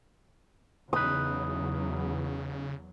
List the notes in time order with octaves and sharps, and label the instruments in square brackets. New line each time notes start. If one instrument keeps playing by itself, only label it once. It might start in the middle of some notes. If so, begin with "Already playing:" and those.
[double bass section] E2 F#3 [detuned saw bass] C#3 [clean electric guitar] D#4 B4 [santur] D#6